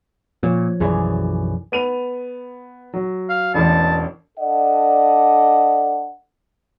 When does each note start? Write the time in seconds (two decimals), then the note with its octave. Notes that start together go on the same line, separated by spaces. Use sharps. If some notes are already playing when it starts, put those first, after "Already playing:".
0.43 A#2 F3 C#5
0.80 B1 F#2 E3 G#4 D5
1.72 B3 D#7 F7
2.94 F#3
3.30 F5
3.54 E1 A1 E2 A5
4.38 D4 A4 D5 D#5 F#5